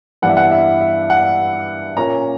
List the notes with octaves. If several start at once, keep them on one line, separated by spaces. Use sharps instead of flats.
G2 E3 B3 D4 F#5
E5
F#5
E5
E5
F#5
A#2 A#3 C#4 A#5